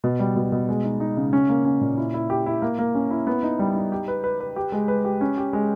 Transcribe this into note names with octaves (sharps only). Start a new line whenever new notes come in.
B2
G3
B2
B2
G#3
D#4
D#4
C#3
C#4
A#3
C#4
A#2
E4
E4
G4
E4
A#3
A#3
C#4
E4
B3
D#4
G3
D#4
G4
B4
B4
B4
G4
G#3
B4
G4
C#4
G4
G#3